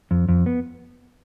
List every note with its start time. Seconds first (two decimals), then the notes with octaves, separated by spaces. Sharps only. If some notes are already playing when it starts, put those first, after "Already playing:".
0.11 F2
0.29 F2
0.46 B3